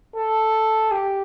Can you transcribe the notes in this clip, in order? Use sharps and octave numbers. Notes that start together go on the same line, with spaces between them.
A4
G4